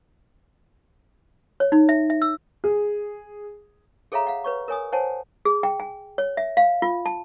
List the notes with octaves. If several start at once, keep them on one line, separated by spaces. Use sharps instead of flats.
C#5
D#4
E5
E5
E6
G#4
G#4 A4 C#5 E5 F5 A#5
F5 F#5
B4 C#5 C#6
A#4 C#5 G#5 D#6
C5 C#5 F#5 G#5 A5
G#4
G5
G#5
C#5
E5
F5
F4
A5